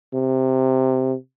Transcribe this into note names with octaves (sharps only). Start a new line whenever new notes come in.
C3